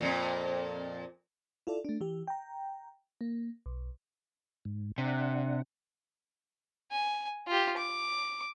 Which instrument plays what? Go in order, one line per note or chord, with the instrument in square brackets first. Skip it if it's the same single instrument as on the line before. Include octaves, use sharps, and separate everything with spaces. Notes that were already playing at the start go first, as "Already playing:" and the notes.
[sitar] F2 A#2
[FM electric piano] E4 F4 A4 D5
A3 D4
E3 G4
G5 A#5
A#3
B1
[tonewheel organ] G#2
[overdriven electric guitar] C3 [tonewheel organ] D4 F#5
[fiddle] G#5
F4 G4
D6